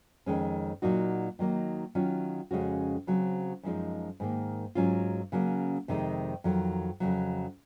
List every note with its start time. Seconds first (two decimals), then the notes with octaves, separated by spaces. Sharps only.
0.26 F2 D#3 G#3 C#4
0.82 A#2 F#3 A#3 D#4 F#4
1.39 D#3 F#3 A#3 D#4
1.95 D#3 F#3 C#4 F4
2.51 F2 C#3 G#3 C#4 F#4
3.07 C#3 F#3 C4
3.63 F#2 F3 G#3 D#4
4.20 G#2 D#3 A#3
4.75 G#2 F#3 C#4 F4
5.32 C#3 F#3 A#3 C#4
5.88 F2 C3 D#3 G#3 D#4
6.44 F2 D#3 F#3
7.00 F2 C#3 F#3